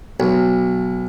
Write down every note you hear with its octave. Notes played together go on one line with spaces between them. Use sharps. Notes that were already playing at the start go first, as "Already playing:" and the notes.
B1